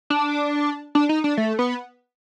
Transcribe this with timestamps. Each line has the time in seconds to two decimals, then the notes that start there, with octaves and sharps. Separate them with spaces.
0.10 D4
0.95 D4
1.09 D#4
1.24 D4
1.37 A3
1.59 B3